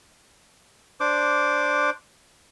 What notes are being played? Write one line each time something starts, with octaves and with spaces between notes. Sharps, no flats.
D4 C5 D6